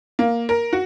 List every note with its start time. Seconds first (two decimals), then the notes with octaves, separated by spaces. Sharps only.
0.19 A#3
0.49 A#4
0.73 F#4